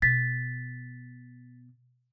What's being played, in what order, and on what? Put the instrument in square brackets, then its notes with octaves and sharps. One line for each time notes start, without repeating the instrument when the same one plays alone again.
[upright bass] B2 [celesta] A6 B6